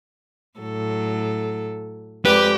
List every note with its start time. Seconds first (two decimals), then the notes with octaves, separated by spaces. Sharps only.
0.59 A2 F#3 A4
2.25 F2 G#3 G4 B4 D5